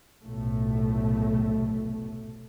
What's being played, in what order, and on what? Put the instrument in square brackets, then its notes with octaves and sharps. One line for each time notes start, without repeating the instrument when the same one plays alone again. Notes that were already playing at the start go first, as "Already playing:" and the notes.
[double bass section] F1 B1 A2 A3